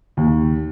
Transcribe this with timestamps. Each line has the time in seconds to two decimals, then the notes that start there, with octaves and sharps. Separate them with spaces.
0.17 D#2